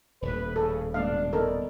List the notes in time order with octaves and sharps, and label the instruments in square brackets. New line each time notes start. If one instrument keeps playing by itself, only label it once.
[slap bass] D#1 A2 [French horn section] B4
[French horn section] C#3 [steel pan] A4
[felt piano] G#2 B2 [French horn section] D4 [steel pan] F5
[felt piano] D#3 B3 [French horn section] D#4 D5 [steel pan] A4 A#4